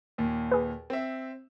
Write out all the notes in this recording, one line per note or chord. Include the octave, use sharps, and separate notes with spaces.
D#2 A#2
G#4 B4
C4 E5